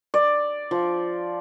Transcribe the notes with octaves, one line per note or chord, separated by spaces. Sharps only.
D5
F3